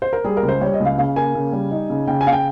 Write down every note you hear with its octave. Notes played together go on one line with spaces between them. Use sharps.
C5
A#4
G3 G#4
A#4
C#2
C5
G3 C#5
D#5
C#2
F5
C#3 F5
A#3 G#5
C#3
G3
D#4
C#3
C#3 G5
G#5
C#3 F5
G5